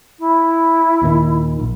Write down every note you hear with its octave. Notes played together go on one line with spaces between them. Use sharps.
E4
D#2 A#2 D#3
A#1